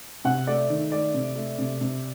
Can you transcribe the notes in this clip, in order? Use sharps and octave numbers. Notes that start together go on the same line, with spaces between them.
C3 F#5
A3 D5
D#3
A3 D5
C3
A3
C3
C3